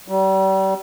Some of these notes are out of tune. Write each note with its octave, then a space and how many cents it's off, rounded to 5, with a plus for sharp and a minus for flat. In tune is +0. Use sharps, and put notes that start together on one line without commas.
G3 -35